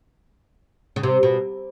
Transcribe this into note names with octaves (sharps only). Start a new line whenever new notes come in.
C#3
C3
B2